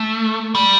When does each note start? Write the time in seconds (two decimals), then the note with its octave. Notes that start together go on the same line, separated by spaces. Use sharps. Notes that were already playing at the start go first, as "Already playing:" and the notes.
Already playing: A3
0.55 G3